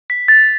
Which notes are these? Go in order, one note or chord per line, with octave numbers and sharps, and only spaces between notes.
B6
A6